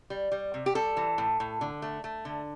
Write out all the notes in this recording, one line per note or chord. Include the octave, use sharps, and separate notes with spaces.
G3
G3
C3
G4
G3 A4
E3
A2
A2
D3
A3
A3
D3